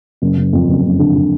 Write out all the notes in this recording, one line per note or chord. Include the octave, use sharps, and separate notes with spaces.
F#1
F#1
F2
F#1
F#1
D3
D3